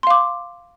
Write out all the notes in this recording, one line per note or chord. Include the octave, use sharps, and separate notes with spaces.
F5 C6 D6